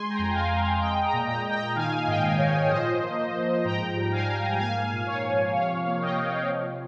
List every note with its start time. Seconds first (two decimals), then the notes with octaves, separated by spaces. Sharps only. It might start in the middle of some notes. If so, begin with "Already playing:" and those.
Already playing: G#3 G#5 C6
0.10 G5 A#5
0.18 F2
0.34 F5 G#5
0.50 G#3
0.57 F5 G#5
0.81 G#3 D#5 G5
1.04 G5 A#5
1.13 A#2
1.28 G5 A#5
1.45 A#2
1.52 G5 A#5
1.75 D#3 F5 G#5
2.07 G#2 D#5 G5
2.38 G#2 C#5 F5
2.63 C#5
2.70 F3 C5 D#5
3.02 A#3
3.34 F3
3.65 G#2 G5 A#5
3.96 G3
4.12 F5 G#5
4.27 G#2
4.59 A#3 F5 G#5
4.91 A#2
5.07 C#5 F5
5.22 F3
5.54 C3 C#5 F5
5.86 A#3
6.01 D#5 G5
6.17 C3
6.49 F3